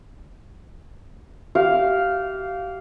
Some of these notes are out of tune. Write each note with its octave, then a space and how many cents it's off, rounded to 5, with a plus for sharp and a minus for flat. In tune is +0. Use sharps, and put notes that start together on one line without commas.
G4 -30 F5 +0